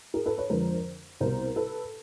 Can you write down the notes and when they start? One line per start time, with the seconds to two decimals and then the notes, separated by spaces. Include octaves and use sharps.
0.14 G#4 A#4
0.26 A4 B4
0.38 B4 C#5
0.50 F2 D3 F3 G#3 A#4 C5
1.20 C2 B2 G3 A#4 C5
1.56 A4 B4